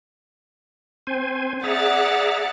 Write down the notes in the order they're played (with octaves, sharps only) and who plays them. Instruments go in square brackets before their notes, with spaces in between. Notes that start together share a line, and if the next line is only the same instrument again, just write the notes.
[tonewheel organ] C4 C5 G#5
[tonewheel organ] G#4 E5 A#5 [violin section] D5 F#5 A6